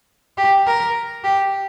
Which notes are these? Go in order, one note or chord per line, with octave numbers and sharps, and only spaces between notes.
G4
A#4
G4